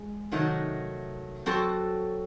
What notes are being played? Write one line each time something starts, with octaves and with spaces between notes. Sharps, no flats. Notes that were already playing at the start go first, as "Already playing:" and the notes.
Already playing: G#3
C3 D#3 F#3 A3 D#4
F#3 C4 F#4 A4